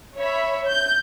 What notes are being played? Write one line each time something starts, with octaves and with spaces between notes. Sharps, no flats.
C#5 E5 B5
G6